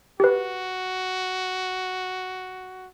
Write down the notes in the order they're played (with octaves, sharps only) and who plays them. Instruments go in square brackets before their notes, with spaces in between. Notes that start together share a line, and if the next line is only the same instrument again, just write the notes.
[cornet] F#4 [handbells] G4 B4